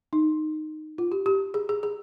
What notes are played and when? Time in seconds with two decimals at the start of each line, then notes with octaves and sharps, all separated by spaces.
0.13 D#4
0.98 F4
1.12 G4
1.26 G4
1.54 G#4
1.69 G#4
1.83 G#4